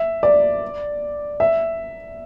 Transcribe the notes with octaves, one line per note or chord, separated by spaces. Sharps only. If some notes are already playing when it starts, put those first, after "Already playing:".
Already playing: E5
D5
E5